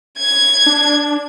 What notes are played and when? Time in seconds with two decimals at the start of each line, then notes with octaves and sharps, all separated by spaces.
0.18 G#6
0.66 D4